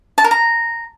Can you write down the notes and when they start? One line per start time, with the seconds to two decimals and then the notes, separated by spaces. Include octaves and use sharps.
0.18 A5
0.24 A#4
0.31 A#5